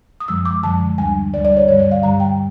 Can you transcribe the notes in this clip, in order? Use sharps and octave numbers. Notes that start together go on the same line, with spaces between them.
D#6
F#2 D3 F3 G#3 E6
D6
F#2 D3 F3 G#3 A5
D2 D3 G3 G#5
D2 D3 G3 D5
D5
C#5
G2 D3 G3 C#5
D5
F5
G2 D3 G3 A#5
G5